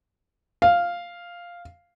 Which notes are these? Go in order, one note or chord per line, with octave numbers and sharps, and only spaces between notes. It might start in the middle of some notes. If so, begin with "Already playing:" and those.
F5